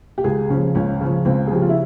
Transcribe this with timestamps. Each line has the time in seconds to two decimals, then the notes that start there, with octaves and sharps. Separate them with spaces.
0.18 G4
0.24 C#2 G#4
0.50 C#3 F3 C#4
0.75 C#2 C#4
1.01 C#3 F3
1.25 C#2 C4
1.47 G#4
1.51 C#3 F3 G4
1.62 F4
1.69 E4